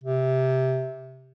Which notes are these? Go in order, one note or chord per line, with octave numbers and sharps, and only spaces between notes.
C3